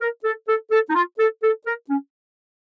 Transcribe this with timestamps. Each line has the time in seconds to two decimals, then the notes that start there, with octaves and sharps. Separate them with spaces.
0.01 A#4
0.24 A4
0.48 A4
0.71 A4
0.89 D#4
0.95 F4
1.19 A4
1.43 A4
1.66 A#4
1.90 C#4